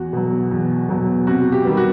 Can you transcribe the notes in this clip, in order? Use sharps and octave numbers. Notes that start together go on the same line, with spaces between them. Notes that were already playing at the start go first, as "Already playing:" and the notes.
Already playing: E2 F#4
B2 F#3
E2
B2 F#3
C3 F#4
G4
D#3 G3 B3
F#4